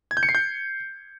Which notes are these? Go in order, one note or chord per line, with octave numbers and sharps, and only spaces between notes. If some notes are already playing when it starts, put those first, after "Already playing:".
G#6
G6
C#7
C7
G6